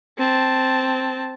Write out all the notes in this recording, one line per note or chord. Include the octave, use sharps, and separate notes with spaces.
C4 A5